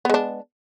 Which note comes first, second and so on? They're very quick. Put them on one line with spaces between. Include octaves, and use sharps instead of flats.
B3 G#3 D4